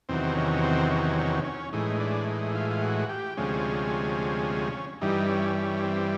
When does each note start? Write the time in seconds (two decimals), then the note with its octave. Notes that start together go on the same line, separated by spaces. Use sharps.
0.09 E2 C3 D#3 F#3 C4
0.35 C#4
0.63 C4
0.91 C#4
1.18 C#4
1.45 C#4
1.72 A2 E3 G#3 D#4
2.00 D4
2.27 D#4
2.55 F4
2.71 F4
2.82 F#4
3.09 G4
3.37 D2 C3 F3 G#3 C#4
5.01 G2 E3 G3 D#4
5.29 C#4
5.56 C#4
5.83 C4